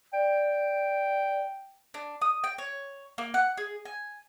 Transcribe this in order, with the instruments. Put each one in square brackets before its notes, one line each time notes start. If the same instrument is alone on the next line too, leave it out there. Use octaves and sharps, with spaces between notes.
[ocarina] D5 [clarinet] G5
[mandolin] D4
D#6
G5
C#5
A#3
F#5
G#4
G#5